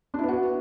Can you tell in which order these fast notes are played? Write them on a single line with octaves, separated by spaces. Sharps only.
D4 E4 B3 F#4